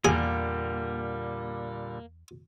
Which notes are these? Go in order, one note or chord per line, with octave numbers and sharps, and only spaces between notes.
E2 A#2 D3 G3 A#3 G#4